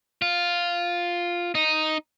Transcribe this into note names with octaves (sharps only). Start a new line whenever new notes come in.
F4
D#4